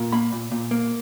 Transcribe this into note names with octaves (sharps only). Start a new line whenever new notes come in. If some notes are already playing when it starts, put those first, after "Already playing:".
Already playing: A#2
A#3 B5
A#2
A#2
A#3